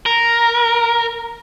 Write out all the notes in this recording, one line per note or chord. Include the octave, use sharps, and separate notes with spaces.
A#4